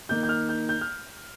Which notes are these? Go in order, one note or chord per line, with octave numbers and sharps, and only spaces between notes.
D#3 A#3 D#4 G6
G6
F6
G6
G6
F6